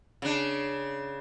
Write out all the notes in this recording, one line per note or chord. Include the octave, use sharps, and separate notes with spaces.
C#3 D4